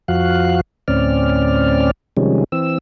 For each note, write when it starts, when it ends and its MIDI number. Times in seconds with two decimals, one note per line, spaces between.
0.08 0.61 41
0.08 0.61 53
0.08 0.61 66
0.08 0.61 77
0.08 0.61 90
0.88 1.91 38
0.88 1.91 45
0.88 1.91 60
0.88 1.91 61
0.88 1.91 74
0.88 1.91 89
2.17 2.44 48
2.17 2.44 51
2.17 2.44 53
2.17 2.44 55
2.17 2.44 56
2.17 2.44 61
2.52 2.78 52
2.52 2.78 60
2.52 2.78 88